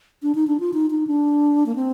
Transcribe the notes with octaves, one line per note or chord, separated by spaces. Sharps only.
D4
D#4
D4
F4
D#4
D#4
D4
A#3
C4